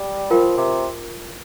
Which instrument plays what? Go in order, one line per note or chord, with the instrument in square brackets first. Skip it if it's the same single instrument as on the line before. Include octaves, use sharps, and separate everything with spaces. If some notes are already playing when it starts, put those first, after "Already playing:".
Already playing: [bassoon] G3
[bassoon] F3 [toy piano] F4 A#4 G5
[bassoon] C3